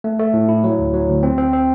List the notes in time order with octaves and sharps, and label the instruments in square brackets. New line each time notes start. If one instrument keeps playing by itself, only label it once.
[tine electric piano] A3
A3
A2
E4
F#3
D2
F#3
D2
C4
C4
C4